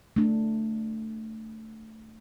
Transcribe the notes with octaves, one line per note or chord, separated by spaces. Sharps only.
A3 D4